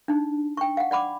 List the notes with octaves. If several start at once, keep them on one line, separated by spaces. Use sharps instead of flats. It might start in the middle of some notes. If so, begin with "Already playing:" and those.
D4 D#4
G5 C#6
F5 F#5
D5 F#5 B5 D6